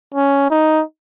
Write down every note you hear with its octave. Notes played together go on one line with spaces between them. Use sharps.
C#4
D#4